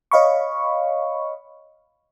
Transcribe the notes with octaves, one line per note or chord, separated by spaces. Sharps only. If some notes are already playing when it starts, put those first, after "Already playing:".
C#5 D#5 F5 B5 C#6